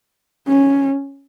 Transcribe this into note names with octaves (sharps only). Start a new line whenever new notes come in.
C#4